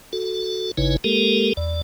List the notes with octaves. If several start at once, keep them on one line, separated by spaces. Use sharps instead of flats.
F#4 A4
G#1 C#3 D#4 E4 B4 C#5
G#3 A#3 G4 A4 A#4
E2 D5